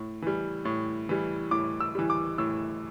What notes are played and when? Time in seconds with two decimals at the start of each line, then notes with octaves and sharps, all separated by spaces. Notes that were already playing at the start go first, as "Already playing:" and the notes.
Already playing: A2
0.22 E3 G3
0.65 A2
1.09 E3 G3
1.51 A2 D6
1.80 E6
1.95 E3 G3
2.10 D6
2.38 A2 E6